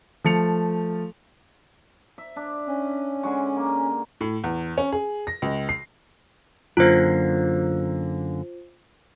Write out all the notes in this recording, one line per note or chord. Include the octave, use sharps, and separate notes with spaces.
F3 A3 A5 C#7 F7
E5
D4
C#4
D3 G#3 C#6
A#3
A2
E2
C#4
G#4
A#6
C#2
C7
F#2 D3 A#3 F4 C5